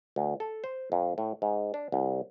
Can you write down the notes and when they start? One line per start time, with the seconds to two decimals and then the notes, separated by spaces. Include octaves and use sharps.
0.16 D2
0.40 A4
0.64 C5
0.92 F2
1.18 A2
1.42 G#2
1.74 D4
1.92 C2